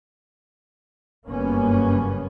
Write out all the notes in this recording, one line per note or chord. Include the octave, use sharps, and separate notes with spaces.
F#1 G2 A#3 B3 C#4